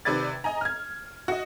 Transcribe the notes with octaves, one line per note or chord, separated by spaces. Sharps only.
C3 D#3 B4 D5 G#6 A6
D#5 G#5 A#5
F6 G#6
F#4 D#5